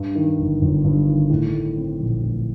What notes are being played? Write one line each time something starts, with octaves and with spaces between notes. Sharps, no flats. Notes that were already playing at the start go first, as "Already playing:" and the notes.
Already playing: G2
D#3
G1
G1
G2
D#3
A2
A3
C4
A#1
A2